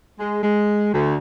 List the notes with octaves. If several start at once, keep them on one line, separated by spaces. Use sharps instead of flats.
G#3
G#3
D2